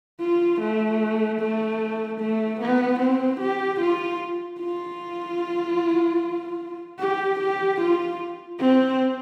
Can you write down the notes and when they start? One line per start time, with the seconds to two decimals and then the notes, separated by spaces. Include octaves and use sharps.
0.20 F4
0.61 A3
1.40 A3
2.20 A3
2.60 B3
3.00 C4
3.40 G4
3.80 F4
4.60 F4
7.00 G4
7.40 G4
7.80 F4
8.59 C4